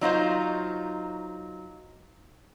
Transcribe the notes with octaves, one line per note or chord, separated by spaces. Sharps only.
F#3 D#4 F4 C5